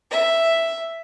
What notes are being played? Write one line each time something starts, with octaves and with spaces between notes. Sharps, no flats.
E5